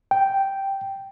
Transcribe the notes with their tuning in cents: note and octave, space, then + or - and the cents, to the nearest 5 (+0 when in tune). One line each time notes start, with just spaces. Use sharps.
G5 -5